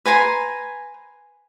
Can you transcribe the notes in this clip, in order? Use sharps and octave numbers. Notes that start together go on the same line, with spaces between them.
B4 G#5 A#5 C6